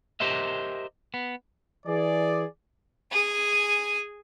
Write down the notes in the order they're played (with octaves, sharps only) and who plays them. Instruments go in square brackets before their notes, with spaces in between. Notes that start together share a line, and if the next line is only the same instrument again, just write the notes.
[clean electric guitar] G4 A#4 C5 D#5 E5
B3
[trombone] E3 [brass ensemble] G#4 D5
[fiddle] G#4 G#5